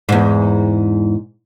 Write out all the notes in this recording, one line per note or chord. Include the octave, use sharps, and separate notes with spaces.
E2 G#2